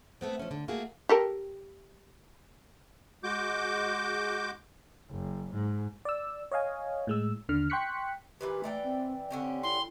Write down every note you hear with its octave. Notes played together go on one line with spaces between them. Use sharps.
A3 B3 C4
F3 C#4
D3
A3 A#3 F4 F#4 G#4
G4 A4 A#4
G#3 F#4 D6 G6
F#1
G#2
D5 E6
C#5 D#5 F5 G#5
A2 G#3 E6
D#2 D3 F6
G5 C6 C#6 F#6 B6 C#7
A#2 E3 G4 B4
E3 A3 D5 G5
C4
D3 C4 C#4 G4
E4 C6